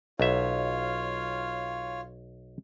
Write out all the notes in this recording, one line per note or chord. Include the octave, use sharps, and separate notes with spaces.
B1 F4 C#5 E5 F5